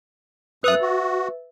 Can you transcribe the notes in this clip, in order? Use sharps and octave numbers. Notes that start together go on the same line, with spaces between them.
F#2 B4 E5 D#6 F#6
F#4